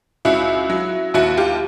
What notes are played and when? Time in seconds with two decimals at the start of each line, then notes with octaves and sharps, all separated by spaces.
0.25 C#2 E4 F#4
0.70 F#3
1.14 D#2 E4 F#4
1.37 F4 G4